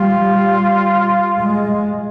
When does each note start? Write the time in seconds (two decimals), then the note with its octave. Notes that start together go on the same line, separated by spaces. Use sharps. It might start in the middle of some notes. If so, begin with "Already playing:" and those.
Already playing: G3 F4
1.39 G#3